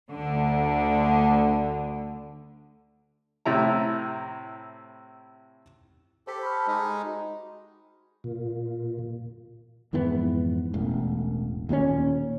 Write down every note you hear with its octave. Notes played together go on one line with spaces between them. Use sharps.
D2 D3
A2 C3 E4 A#5
G4 A4 C5 A5 B6
B5 C#6 F6
G#3 D#4
F#4
A#2
F2 G#2 E3 B3
E1 A1
D#2 A#2 G3 C#4